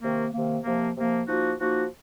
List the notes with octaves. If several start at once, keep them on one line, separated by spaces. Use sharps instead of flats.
C3 D#3 A#3
C3 D#3 A#3
C3 F3 A#3
C3 F3 A#3
F3 A#3 D#4 F#4
F3 A#3 D#4 F#4